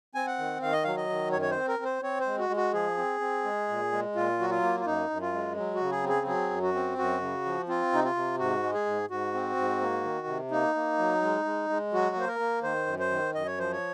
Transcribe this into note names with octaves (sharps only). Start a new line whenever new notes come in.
C4 G#5
F#5
D#3
D#3 F5
D#5
F#3 F5
D#5
D#3
F#2 C#5
C#5
C5
C4
A#4
C4
C5
C4 C#5
C5
G#3
F#4
G#3
F#4
F3 G#4
C4
C4
G#3
A#2
G#3
A#2 F4
F#3 F#4
F4
A#3
F4
F#2 D#4
F#2
F4
G#3
F#3
F#4
C#3
G#4
C4
G#4
F#3 G#4
F#2
F#4
C4
F#2 F#4
C#3
F3
C4 F4
C3 D#4
F4
C3
G#2 F#4
G#3
G#4
G#2
G#2 F#4
C4
G#2
A#3
D#3
C3
A#3 D#4
A#3
F#3
G#3
G#3
G#3
F#3 F#4
A#3 C5
A#4
A#3
D#3 C5
F#2
C5
D#3
F#2 D#5
C#5
F3 C5
C#5